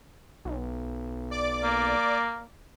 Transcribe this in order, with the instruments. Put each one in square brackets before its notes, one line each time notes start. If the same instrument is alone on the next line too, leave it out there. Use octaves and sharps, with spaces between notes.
[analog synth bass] B1
[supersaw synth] D5 D6
[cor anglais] A#3